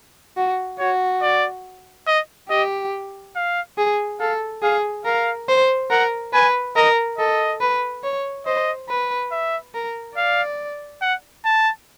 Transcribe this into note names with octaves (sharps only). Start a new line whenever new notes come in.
F#4
F#4 C#5
D5
D#5
G4 D#5
F5
G#4
A4 F5
G#4 F5
A#4 F5
C5
A#4 F#5
B4 G#5
A#4 D#5
A4 D#5
B4
C#5
C5 D#5
B4
E5
A#4
D5 F5
F#5
A5